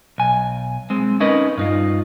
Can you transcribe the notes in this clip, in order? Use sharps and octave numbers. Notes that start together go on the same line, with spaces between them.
B1 G#5
G#3 C4
C#4 D#4 A#4 B4 D#5
G2 D#4 F4